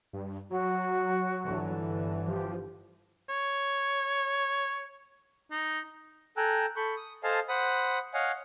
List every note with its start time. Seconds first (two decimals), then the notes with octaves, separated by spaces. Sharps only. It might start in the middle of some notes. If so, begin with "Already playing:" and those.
0.13 G2
0.51 F#3 F#4
1.44 G1 D3 E3
2.27 F3 G4
3.29 C#5
5.51 D#4
6.37 A4 G5 G#5 A#5 E6 F#6
6.76 A4 B5 C#6 G6
6.97 D#6
7.24 A4 C5 D#5 F5 G#5 A5
7.49 C5 F#5 B5 D#6
8.14 C#5 D#5 F5 F#5 G#5